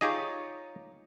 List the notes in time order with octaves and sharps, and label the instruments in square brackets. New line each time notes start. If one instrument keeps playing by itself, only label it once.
[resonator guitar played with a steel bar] D#4 F4 C#5 [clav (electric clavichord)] G4 G#4 D#5